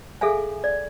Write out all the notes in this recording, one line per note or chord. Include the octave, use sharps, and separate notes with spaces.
G#4 A4 E5 F5 G#5
D5